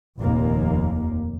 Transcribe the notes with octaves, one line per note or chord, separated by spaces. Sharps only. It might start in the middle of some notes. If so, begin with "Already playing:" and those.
F1 D#2 A#2 A#3